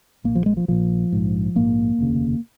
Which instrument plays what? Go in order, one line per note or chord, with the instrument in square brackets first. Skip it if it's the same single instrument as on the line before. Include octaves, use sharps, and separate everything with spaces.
[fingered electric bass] A#1 A#2 A#3
F3
G#3
F3
A#1 A#2 F3
A#1 G#2
A#1 G#2 A#3
F1 D#2 C#3